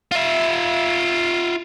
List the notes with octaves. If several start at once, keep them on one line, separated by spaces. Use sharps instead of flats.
F4 E5